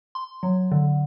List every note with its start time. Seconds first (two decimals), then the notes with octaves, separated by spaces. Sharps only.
0.15 C6
0.43 F#3
0.72 D3